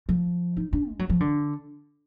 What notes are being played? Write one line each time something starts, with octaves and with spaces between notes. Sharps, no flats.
F3
D#4
D4
G#3
F#3
F3
D3